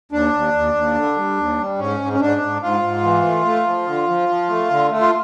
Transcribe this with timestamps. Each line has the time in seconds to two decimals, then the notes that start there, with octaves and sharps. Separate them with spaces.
0.12 D#2 D4
0.33 D#2
0.54 D#2
0.74 D#2
0.95 D3
1.17 G3
1.37 D#2
1.58 G3
1.78 G#2 C#4
2.00 G#2
2.13 C#4
2.20 G#2 D4
2.41 G#2
2.62 G#2 F4
2.82 G#2
3.03 E3
3.25 A3
3.45 A3
3.66 F3
3.86 D3
4.08 F3
4.29 F3
4.49 A3
4.71 D3
4.90 A3
5.00 F4